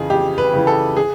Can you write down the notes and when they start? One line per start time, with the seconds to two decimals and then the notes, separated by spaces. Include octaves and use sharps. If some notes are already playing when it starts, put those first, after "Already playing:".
Already playing: F2 C#3 E3 G#4
0.10 F2 G4
0.38 B4
0.53 C#3 E3
0.67 A4
0.97 G#4